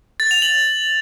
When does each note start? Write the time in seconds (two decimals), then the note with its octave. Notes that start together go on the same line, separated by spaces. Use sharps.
0.20 A6
0.31 F7
0.42 F#7